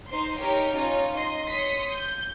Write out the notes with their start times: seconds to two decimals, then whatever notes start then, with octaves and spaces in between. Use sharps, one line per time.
0.11 D#4 C5 C6
0.40 D#4 G4 A#4 C#5
0.76 C#4 D#4 F4 C#5
1.17 D#5 C6
1.49 C#5 C6 D#6 B6 C#7
1.94 G6